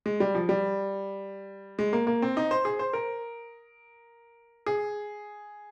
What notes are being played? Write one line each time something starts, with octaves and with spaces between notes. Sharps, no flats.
G#3
G3
F3
G3
G#3
A#3
A#3
C4
D#4
C5
G#4
C5
A#4
G#4